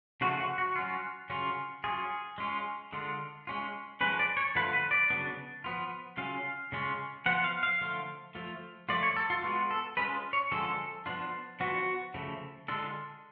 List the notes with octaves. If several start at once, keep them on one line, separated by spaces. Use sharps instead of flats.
C#3 F3 A3 F4 F#4
F#4
F#4
F#3 C#4 F4
C#3 F#3 C#4 F4
F#3 C#4 F4 G#4
G#3 C#4 F4
D3 G#3 D4 F4
G#3 C#4 F4
F3 G#3 C#4 B4
D5
C#5
D3 F3 A3 F4 B4
B4
D5
C#3 F#3 B3 D4
F3 B3 F4
C#3 F#3 C#4 F4 F5
C#3 G#3 C#4 F4
F3 B3 F4 F#5
F5
F5
D3 F3 A3 F4
F3 A3 F4
F3 A3 F4 D5
C#5
A4
F4
G#3 B3 F4 F#4
A4
G#3 C#4 F4 B4
C#5
D3 F3 G#3 C#4 F4 A4
F3 B3 D4 F4
F3 B3 D4 F4 F#4
C#3 F3 A3
D3 G#3 D4 F4 A4